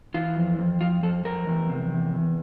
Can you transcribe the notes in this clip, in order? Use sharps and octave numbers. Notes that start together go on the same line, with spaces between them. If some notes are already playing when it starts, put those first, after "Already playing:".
E3 F4
F2
F2
F2 F4
F2 A4
F2 A#4
E2
C3
E2
E2